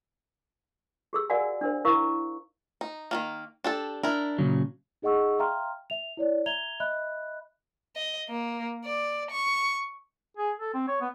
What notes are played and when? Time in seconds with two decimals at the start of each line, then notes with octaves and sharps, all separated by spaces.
1.13 G4 G#4 E6
1.30 F#4 A#4 D5 F5 F#5 G#5
1.61 D4 A#4 C5
1.85 E4 A#4 F5 C#6
2.81 D#4
3.11 D#3 F#3 A#3
3.64 D4 G4 A4
4.03 D4 E4 A#4
4.39 A#2 C#3 F#3
5.02 D#4 G#4 D#5 F#5 C#6 E6
5.39 E5 F5 G5 A#5 C6 F6
5.90 E5 F7
6.17 E4 C#5 D5
6.46 E5 A#5 G#6 F7 G7
6.80 D#5 E5 B5 F#6
7.96 D#5
8.29 A#3
8.85 D5
9.31 C#6
10.37 G#4
10.59 A4
10.74 C4
10.88 C#5
11.01 B3